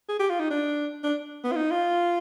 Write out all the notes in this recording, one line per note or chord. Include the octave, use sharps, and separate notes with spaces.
G#4
G4
F4
D#4
D4
D4
B3
F4
D#4
F4